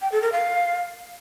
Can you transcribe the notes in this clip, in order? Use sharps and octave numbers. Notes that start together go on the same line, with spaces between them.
G5
A4
A#4
F5